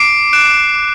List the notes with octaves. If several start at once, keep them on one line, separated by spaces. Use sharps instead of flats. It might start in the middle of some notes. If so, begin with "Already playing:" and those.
Already playing: D6 C7 D7
F#6 D7 E7
D6